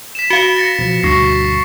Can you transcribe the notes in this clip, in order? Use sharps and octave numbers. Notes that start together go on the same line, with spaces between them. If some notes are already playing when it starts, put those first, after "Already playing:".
B6 E7
F#4 F5 C#7
A6 A#6 C#7
B2 F3
D2 G2 B2 C#6 A#6 C7